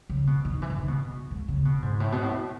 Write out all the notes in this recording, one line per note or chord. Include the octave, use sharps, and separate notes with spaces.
C#3
B2
D#3
E3
D#3
C#3
B2
G#2
C#3
B2
G#2
A2
B2
A2